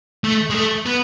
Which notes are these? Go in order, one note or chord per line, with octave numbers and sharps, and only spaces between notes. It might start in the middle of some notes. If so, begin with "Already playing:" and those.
A3
G#3
A3
B3